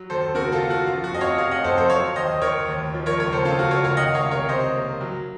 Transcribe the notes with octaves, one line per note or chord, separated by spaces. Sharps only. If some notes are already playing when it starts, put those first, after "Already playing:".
Already playing: F#3
D#2 A4 C5
C#3 F#4 A#4
F4 A4
A#3
F#4
F3 F4
F#4
F2 D#5
C#5 F5
C3 C#5 F5
D#5 F#5
F2 A4 C5
A4 C5
F#3 C#5 F5
D#2 C5 D#5
D#3 A#4 C#5
D#2
F3
A#4 C#5
C#2 A#4 C#5
A4 C5
C#3 F4 A4
F#4
C#2 A#4 C#5
C#5 F5
D#3 D#5 F#5
C#5 F5
C2
A#4 C#5
C3 C5 D#5
A#3
F#3